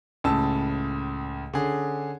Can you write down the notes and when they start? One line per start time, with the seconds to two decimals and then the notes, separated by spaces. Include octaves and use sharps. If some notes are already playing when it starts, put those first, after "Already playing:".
0.24 C#2 A2 C#3 A5 E6
1.54 D3 C#4 G#4